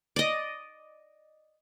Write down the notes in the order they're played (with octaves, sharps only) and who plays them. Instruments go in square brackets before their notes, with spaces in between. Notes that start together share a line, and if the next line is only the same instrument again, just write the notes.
[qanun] D5 D#5